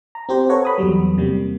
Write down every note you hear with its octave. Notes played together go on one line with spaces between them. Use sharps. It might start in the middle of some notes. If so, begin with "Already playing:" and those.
A#5
C4 G4 C5
A4 B4 C#5 F#5 A#5
B5 D#6
E2 F#3 G3
C3 G3 A#3